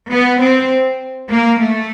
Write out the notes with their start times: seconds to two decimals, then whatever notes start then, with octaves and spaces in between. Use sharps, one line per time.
0.11 B3
0.41 C4
1.30 A#3
1.59 A3